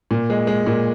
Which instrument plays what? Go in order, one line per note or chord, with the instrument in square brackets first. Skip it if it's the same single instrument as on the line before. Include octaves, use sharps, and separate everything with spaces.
[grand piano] A#2
G#3
G#3
A#2